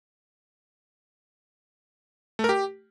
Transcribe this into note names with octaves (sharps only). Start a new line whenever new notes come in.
A3
A#4
G4